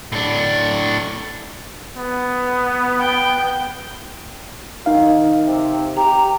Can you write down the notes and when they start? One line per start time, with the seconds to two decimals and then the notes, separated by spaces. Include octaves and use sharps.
0.12 A2 D4
1.97 B3
3.01 G5
4.86 D#3 D#4 F5
5.46 C3
5.97 G4 A#5